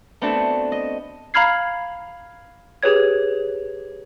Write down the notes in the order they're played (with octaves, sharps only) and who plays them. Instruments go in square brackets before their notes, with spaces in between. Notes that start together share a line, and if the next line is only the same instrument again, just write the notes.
[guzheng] A3 B3 C4 D4 F#4 A5
D#5
[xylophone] F5 A#5 B5 F6 G#6 C7
G4 G#4 B4 C#5 G#6